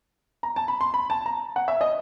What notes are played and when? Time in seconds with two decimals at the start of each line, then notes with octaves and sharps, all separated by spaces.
0.43 A#5
0.56 A5
0.68 B5
0.81 C6
0.94 B5
1.10 A5
1.26 A#5
1.56 F#5
1.68 E5
1.81 D#5